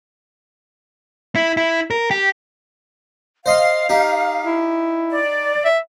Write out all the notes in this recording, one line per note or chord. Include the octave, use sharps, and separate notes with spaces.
E4
E4
A#4
G4
C5 D#5 F5 C6
D#4 G4
E4
D5
E5